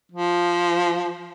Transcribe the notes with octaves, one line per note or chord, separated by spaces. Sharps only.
F3